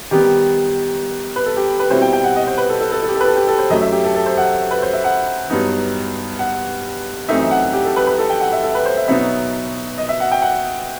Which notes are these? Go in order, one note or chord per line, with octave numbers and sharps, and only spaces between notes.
D#3 G3 B3 G4
B4
A4
G4
B4
B2 G3 C4 E4 C5
G5
G5
F#5
D#5
C5
B4
A4
A4
A4
A4
G4
A4
B4
A4
G4
A4
C5
F#2 F#3 A3 D#5
E5
G4
A4
A4
C5
F#5
B4
C5
E5
F#5
G2 F#3 B3 D#4
F#5
F#2 E3 A3 C4 D#4 E5
E5
F#5
F#5
G4
A4
B4
B4
A4
G5
F#5
E5
A4
B4
C5
E5
B2 F#3 B3 D#4 E5
D#5
E5
F#5
G5
F#5